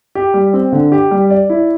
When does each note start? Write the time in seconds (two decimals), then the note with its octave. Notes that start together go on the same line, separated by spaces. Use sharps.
0.15 G4
0.34 G3
0.54 C4
0.72 D3
0.92 G4
1.11 G3
1.30 D5
1.50 E4